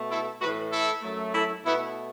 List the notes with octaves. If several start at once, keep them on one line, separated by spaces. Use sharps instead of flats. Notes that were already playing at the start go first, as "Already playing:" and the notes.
Already playing: B2 A3
E4 A4
A2 E3 A3 F#4 B4
E4 A4
F#2 F#3 A3
E4 A4
B2 A3 B3 E4